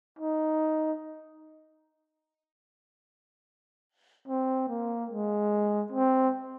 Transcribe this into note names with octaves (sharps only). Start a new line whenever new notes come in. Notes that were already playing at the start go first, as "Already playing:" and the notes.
D#4
C4
A#3
G#3
C4